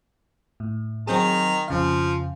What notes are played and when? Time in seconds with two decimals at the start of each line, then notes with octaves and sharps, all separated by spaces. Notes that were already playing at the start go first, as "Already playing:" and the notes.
0.60 A2
1.07 D#3 F#3 C4 G#4 A#5
1.68 F2 C#3 F3 F5